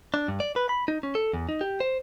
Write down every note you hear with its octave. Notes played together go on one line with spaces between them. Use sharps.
D4
G2
D5
B4
B5
D#4
C#4
A4
E2
D#4
G4
C5